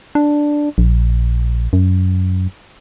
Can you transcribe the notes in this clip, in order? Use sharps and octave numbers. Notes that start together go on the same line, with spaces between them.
D4
A#1
F#2